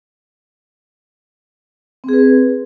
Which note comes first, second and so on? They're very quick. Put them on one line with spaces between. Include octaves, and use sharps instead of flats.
C4 G#4 B4